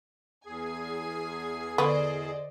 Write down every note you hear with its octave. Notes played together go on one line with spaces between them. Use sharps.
E2 G#4 G#5
D3 B3 A4 C5 D5 D#5 C#6